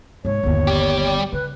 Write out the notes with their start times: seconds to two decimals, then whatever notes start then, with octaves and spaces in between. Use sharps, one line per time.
0.25 G#2 C3 C#5
0.43 G1 D#2
0.67 G3 G4
1.17 F#2
1.32 C#3 B4